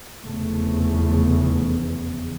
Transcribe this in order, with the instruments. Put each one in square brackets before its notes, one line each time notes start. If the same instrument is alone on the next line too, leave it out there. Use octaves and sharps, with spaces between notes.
[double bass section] F1 E2 C#3 A3